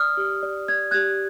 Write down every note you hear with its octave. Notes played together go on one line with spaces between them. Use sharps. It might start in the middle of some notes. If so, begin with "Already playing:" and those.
Already playing: D5 D#6 F6
G4
D5
D5 G#6
G4 F#6 G#6